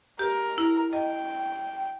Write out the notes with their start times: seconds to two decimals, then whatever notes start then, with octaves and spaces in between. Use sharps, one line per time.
0.19 G4 A#4
0.58 E4
0.93 D#5 G5